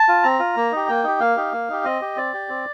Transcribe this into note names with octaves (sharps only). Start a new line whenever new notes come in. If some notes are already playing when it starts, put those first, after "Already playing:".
Already playing: A5
F4
C4 A#5
F4
A#3
D#4 G4
A#3 G5
D#4 G4
A#3 F5
D#4 G4
A#3
D#4 G4
C4 D#5
G4
C4 D5
G4
C4